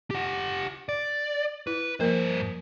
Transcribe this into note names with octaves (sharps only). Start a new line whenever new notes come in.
G4 F#5
D5
E4 B4
G2 F3 A#3 A#4 C5